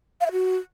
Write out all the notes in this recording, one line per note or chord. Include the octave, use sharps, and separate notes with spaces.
F5
E5
F#4